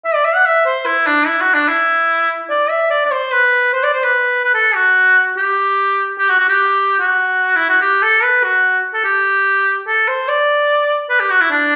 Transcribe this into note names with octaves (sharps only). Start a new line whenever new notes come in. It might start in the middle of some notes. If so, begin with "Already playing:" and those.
E5
D5
E5
F#5
E5
C5
E4
D4
E4
F#4
D4
E4
D5
E5
D5
D5
C5
B4
C5
D5
C5
B4
B4
A4
F#4
G4
G4
F#4
F#4
G4
F#4
E4
F#4
G4
A4
B4
F#4
A4
G4
A4
C5
D5
B4
G4
F#4
E4
D4